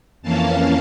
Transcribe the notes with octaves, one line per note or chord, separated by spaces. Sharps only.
F2 E3 A#3 C#4 F5 A5